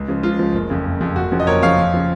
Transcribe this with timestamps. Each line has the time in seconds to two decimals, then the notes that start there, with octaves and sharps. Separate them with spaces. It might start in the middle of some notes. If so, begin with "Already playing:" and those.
Already playing: C#2
0.08 C#3 F3
0.23 C#2 F4
0.39 C#3 F3
0.54 F#1
0.70 F2 C#3
0.85 F#1
1.01 F2 C#3
1.16 F#1 F#4
1.32 F2 C#3 F3
1.40 D#5
1.47 F#1 A#4 C#5
1.62 F2 C#3 F3 C#5 F5
1.78 F2
1.93 C#3 F3